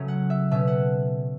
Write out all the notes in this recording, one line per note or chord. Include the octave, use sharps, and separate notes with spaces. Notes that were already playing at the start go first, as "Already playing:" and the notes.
Already playing: C#3 F#3 A3 C#4
F#5
E5
B2 A3 C#4 E5
F#5